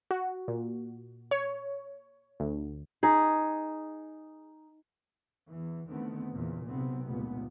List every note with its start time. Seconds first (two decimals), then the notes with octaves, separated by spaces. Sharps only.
0.11 F#4
0.48 A#2
1.31 C#5
2.40 D2
3.03 D#4 G#4
5.52 E2 E3
5.89 E2 D3 D#3 A3 B3 C4
6.34 E2 A#2 C#3
6.68 B1 C3 B3 C4
7.05 F1 C#2 A#2 B3